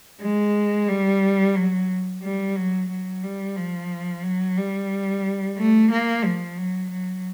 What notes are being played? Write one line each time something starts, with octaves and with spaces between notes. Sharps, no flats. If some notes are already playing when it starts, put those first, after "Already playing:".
G#3
G3
F#3
G3
F#3
F#3
G3
F3
F#3
G3
A3
A#3
F3
F#3
F#3